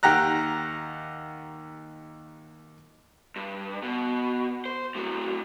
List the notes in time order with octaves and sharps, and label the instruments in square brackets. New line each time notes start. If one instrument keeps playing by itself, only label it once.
[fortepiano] D#2 G4 F#5 A#5 F#6
[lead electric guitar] G2
B2
C5
A2 F#3